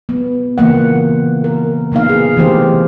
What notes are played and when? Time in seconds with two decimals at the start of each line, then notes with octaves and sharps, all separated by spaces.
0.09 B3
0.58 C#3 E3 A#3 F#5
1.44 A#4
1.92 C3 A#3 B3 D#4 F5
2.09 G#4
2.37 C3 E3 A3 D#4 G4 C5